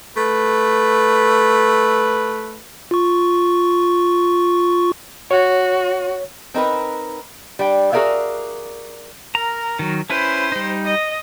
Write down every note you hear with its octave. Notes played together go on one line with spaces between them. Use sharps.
A3 B4
F4 C#6
F#4 C#5
C4 D#4 A#4 B4
G3 D4 G5
F#4 G#4 A#4 D5 E5 F5
A#4 A#5
D#3 F#3
C#4 E4 B4 C5
G3 D#4
D#5